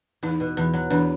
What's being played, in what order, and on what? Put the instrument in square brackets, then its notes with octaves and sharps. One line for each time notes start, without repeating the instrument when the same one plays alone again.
[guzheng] E2 [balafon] D#4
[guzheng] B2
E2
F#3
[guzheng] E2 [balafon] D4